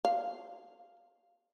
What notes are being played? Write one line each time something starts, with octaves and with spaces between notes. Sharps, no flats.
F5